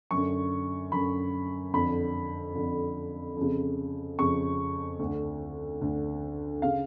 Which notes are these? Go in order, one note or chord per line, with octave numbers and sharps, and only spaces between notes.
F#2 D3 C#6
F#2 D3 B5
F2 D3 B5
F2 D3
F2 C#3
F2 C#3 C#6
D2 D3
D2 D3
C#3 F5